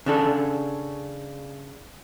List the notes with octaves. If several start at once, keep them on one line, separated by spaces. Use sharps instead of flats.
C#3 D4 A4